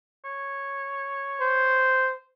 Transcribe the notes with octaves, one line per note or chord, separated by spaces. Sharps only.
C#5
C5